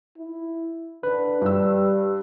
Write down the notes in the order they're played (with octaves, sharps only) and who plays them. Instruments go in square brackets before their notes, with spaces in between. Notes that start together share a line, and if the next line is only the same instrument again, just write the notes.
[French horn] E4
[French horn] D3 [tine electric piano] B4
[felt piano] G2 E6 [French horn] G3